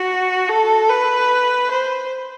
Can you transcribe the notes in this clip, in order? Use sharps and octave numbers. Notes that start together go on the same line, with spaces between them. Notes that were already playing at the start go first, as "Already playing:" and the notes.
Already playing: F#4
A4
B4
C5